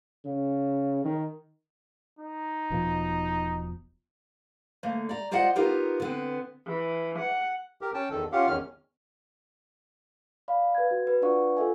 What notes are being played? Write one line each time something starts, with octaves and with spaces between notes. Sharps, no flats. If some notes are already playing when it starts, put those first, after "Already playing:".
C#3
D#3
D#4
E1 B2 F3
D3 A3 A#3
D5 A#5
F4 C5 D5 D#5 F#5
B3 D#4 F4 G4 A#4
D3 B3 C4
E3
F#5
G4 A#4
C#4 G5 A5
E2 D#3 A4
C#4 F4 G4 F5 F#5
E2 D#3 C#4 F6
D5 F5 B5
B4 G#6
F#4
B4
D4 F4 B4 D5 F#5 C#6
F4 A4 E5 G#5